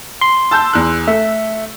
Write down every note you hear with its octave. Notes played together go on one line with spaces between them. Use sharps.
C6
A5 E6 G6
E2 F#6
A3 E5